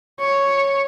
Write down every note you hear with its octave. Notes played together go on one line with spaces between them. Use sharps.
C#5